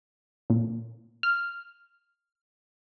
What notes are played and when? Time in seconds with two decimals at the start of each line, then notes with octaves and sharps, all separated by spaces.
0.50 A#2
1.23 F6